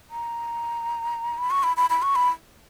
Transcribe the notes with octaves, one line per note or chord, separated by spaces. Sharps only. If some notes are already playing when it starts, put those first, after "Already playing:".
A#5
B5
C#6
B5
B5
B5
C#6
B5